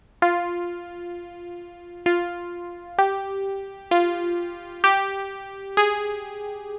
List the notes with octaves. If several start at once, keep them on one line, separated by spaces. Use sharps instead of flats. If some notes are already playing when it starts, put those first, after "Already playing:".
F4
F4
G4
F4
G4
G#4